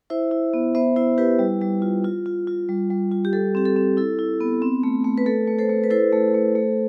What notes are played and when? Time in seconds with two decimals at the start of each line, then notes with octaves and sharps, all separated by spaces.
0.10 E4 C5 E5
0.31 E4
0.54 B3
0.75 B3 C5 E5
0.96 E4 C5 E5
1.18 E4 G4 B4
1.39 G3
1.61 G3
1.82 F4
2.04 F4
2.26 F4
2.47 F4
2.69 G3
2.90 G3
3.12 F4
3.25 G4
3.33 G3 A4
3.55 C4 G4
3.65 A4
3.76 C4
3.97 E4 A4
4.19 E4
4.40 B3
4.62 C4
4.83 A3
5.04 A3
5.18 B4
5.26 A3 A4
5.48 A3
5.59 A4 C5
5.69 A3
5.84 B4
5.91 E4 A4 C5
6.12 A3
6.34 A3
6.55 A3